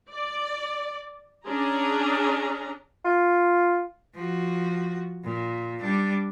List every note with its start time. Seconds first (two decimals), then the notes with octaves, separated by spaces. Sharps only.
0.11 D5
1.48 C#4 D4 G#4 A#5
3.05 F4
4.15 F3 F#4
5.24 A#2
5.81 G3 D4